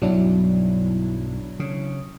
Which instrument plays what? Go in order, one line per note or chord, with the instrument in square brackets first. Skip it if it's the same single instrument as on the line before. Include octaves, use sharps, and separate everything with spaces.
[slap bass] B1 G2 [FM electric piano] F#3 D4 E4
[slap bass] C#3